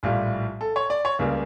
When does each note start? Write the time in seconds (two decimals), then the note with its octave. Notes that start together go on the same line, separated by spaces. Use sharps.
0.03 A#1 A2 G3 F4
0.61 A4
0.76 C#5
0.90 D5
1.05 C#5
1.19 C#2 C#3 G3 A#3